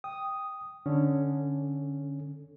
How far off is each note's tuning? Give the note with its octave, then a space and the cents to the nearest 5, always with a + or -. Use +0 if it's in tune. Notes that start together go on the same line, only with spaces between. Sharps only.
G5 +0 D#6 +0
D3 +0 C#4 +0 A4 +0